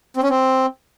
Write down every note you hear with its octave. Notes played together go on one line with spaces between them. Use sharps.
C4
C#4
C4